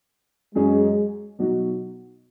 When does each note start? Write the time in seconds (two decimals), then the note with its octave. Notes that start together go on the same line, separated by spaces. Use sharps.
0.55 F#2 F#3 G#3 C#4 G#4
1.39 B2 F#3 D#4 F#4